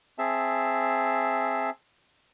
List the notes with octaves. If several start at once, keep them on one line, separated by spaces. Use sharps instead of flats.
C4 G#4 E5 A5